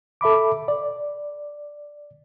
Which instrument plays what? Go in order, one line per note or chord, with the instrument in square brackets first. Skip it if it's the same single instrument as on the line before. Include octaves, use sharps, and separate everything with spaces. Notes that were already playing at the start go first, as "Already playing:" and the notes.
[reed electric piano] A4 E5 B5 D6
D5